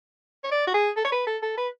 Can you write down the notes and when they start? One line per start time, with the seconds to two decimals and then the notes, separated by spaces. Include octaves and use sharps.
0.44 C#5
0.51 D5
0.67 F#4
0.74 G#4
0.97 A4
1.05 C#5
1.12 B4
1.27 A4
1.42 A4
1.57 B4